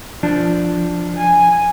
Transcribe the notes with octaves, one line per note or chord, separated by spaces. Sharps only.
F3 D4
G#5